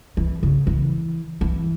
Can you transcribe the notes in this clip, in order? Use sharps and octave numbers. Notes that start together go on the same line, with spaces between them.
E3
C#3
E3
E3